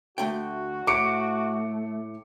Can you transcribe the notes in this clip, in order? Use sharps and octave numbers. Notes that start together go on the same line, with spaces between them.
D2 A3 F#4 G5
A2 A3 D6 C#7 D7